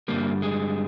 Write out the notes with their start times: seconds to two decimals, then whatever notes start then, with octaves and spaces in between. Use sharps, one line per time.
0.08 G2 D3 G3 A#3
0.42 G#3